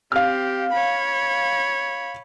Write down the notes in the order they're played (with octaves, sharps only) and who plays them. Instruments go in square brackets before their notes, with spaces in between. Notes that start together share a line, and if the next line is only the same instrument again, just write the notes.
[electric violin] C4 G4 [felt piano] F5 F6
[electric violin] C#5 B5